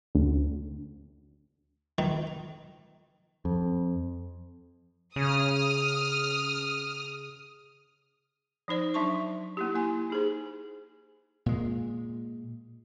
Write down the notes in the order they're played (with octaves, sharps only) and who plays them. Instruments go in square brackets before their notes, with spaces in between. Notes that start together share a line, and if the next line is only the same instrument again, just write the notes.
[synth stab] D2
[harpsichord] D#3
[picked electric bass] F2
[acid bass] C#3 [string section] D#6 F6
[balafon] F3 D#4 C5 D5
F#3 D4 E5 A5 C6 C#6
A#3 E4 G4
A#3 E4 G#5
D#4 G#4 C5
[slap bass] A#2 G#3